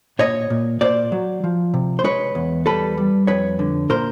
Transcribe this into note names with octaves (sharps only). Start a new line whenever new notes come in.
A#2 C#5 D#5
A#2
A#2 C5 D5
F#3
F3
C3
C5
G#3 B4 C#5
E2
G3 A4 B4
G3
F2 B4 C#5
D3
A#2 A#4 C5